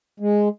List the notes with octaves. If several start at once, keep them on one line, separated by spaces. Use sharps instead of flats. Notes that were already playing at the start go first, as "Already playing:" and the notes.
G#3